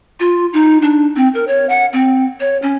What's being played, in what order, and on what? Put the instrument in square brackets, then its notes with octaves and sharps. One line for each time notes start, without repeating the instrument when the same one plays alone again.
[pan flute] F4
D#4
D4
C4
A#4
C#5
F#5
C4
C#5
C#4